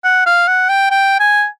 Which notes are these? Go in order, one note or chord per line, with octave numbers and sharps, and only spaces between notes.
F#5
F5
F#5
G5
G5
G#5